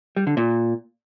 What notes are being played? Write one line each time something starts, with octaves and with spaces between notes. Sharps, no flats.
G3
D3
A#2